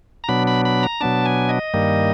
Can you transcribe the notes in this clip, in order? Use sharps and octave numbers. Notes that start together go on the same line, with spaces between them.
A#5
B2 F#3 B3 D4 B5
B5
B5
A#5
B2 F#3 B3 D4 A5
G#5
D#5
G2 D#3 G3 A#3